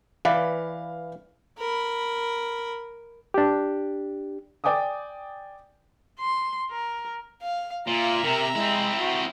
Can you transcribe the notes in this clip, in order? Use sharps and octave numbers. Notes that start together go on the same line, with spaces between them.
E3 B4 D5 F5
A#4 B5
D4 G4
D5 G5 G#5 D6 D#6
C6
A#4
F5
A#2 F4 E5 A#5
C3 A#4
G#3 C4 E4
F#4